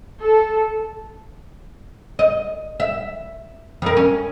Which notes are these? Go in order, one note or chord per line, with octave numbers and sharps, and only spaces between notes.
A4
D#5
E5
F2 A#4
C#4